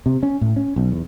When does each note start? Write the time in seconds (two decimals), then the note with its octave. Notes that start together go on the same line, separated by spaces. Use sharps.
0.06 C3
0.23 C#4
0.41 A2
0.56 C#4
0.76 B1
0.92 E2